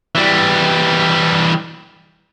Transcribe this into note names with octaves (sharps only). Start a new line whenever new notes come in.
E3 G3